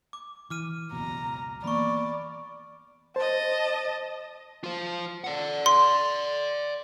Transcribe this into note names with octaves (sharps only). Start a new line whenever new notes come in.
D6
E3 D6 F6 D#7
F#1 C#2 B2 A#5
E3 A#3 B3 D5 B5 C#6
C5 D#5 A5
F4 C5
D5 F#5
C6